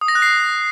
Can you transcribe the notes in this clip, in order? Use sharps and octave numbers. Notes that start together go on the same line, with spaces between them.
D#6
A#6
F#6
C7